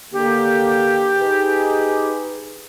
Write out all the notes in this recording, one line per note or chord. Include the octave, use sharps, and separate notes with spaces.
D3 A#3 G4
D#4 G#4 B4